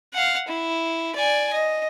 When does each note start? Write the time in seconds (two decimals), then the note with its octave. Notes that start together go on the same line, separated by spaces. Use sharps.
0.14 F5 F#5
0.48 E4
1.16 D5 G#5
1.53 D#5